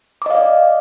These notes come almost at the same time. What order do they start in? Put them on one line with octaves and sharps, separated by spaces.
D6 D#5 F5 D5